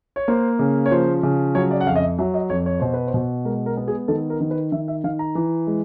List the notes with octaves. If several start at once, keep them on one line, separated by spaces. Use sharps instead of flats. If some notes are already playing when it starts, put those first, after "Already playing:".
C#5
A#3 C5
C#3
C#5
F3 C5
C#3
F#3 C#5
D5
F#5
F2 F5
D#5
E5
F#3 E5
D#5
F2 C#5
C#5
B2 C5
B4
C5
B2
G#3 A#4
A#4
B3
G#4
D#3 A4
A#4
D#3
B4
D#3 E5
E5
D#3 F5
A#5
E3
G#3